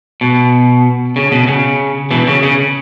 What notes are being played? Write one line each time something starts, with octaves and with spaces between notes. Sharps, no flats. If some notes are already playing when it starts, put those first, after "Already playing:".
B2
C#3
B2
C#3
B2 E3
C#3
C#3